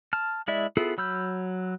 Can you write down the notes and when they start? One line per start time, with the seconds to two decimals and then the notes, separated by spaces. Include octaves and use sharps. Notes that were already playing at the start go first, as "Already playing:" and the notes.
0.13 A5 F6
0.48 G#3 E4 D5 E5
0.77 B3 E4 F4 G#4 A4
0.98 F#3 B5 E6 F6 G6